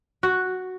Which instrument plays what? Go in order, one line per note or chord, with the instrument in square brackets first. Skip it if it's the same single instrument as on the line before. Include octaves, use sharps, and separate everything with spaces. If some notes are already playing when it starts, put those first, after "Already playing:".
[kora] F#4